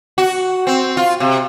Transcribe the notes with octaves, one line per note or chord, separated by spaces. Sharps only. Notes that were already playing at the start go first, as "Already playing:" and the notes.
F#4
C4
F4
C3